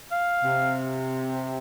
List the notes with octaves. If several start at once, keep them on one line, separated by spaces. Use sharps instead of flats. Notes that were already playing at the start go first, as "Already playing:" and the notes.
F5
C3